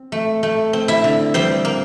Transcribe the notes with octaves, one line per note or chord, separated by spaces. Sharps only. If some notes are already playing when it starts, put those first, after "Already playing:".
Already playing: C4
A3
A3
C4
E4 E5
D3
G3 C4 C5
A#3